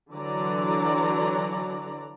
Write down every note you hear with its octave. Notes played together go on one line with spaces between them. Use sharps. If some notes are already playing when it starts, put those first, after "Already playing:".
D3 E3 F#3 D5 A#5